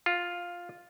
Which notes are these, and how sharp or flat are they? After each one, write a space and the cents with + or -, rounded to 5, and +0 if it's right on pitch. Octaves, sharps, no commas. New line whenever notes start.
F4 +5